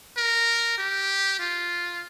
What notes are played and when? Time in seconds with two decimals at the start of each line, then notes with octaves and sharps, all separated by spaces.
0.17 A#4
0.78 G4
1.40 F4